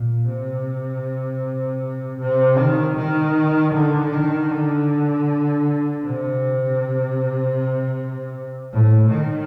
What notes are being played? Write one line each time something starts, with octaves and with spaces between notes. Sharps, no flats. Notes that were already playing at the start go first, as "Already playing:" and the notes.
Already playing: A#2
C3
C3
D#3
D#3
D3
D#3
D3
C3
A2
D#3